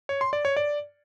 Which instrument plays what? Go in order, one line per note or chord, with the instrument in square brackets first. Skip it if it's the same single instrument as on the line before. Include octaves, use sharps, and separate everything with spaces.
[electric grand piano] C#5
C6
D5
C#5
D5